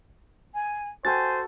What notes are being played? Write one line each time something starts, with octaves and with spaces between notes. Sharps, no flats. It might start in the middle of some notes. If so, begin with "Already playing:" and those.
G#5
F#4 A4 C5 G5 G#5 A6